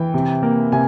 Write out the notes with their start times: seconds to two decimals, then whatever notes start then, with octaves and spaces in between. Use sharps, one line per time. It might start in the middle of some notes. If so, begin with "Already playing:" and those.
Already playing: E3 G5
0.14 C3
0.43 A#3
0.72 C3 G#5